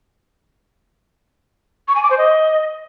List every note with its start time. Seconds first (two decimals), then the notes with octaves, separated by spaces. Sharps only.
1.88 C#6
1.95 G#5
2.03 D6
2.10 C5
2.18 D#5